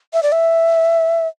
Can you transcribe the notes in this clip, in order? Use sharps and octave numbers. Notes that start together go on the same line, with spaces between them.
E5
D5
E5